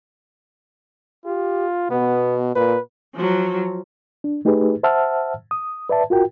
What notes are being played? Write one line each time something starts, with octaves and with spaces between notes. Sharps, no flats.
F4 G4
B2 B3
A#2 B4
F3 F#3
D4
A3 D#4 G4 G#4 B4
C5 E5 F#5 A5 E6 F6
D#6
B4 D5 E5 A5
F4 F#4 A#4 G5